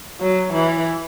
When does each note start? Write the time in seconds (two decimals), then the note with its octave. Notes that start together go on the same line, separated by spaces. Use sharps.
0.21 F#3
0.53 E3